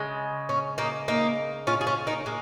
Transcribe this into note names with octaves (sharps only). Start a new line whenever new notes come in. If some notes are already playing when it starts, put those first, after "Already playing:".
Already playing: C#3 G#3
C#4
A#3 D#4
A#3 D#4
C#4 F4
G#4
C#4 F4
A#3 D#4
G#3 A#3